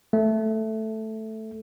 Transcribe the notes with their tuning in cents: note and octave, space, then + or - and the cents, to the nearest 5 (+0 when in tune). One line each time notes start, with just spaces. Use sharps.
A3 +0